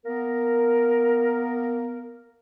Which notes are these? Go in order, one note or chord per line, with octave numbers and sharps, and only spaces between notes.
A#3 B3 A#4